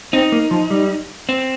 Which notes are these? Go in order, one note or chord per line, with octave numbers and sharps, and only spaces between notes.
C4 D#4
A#3
F3
G3
C4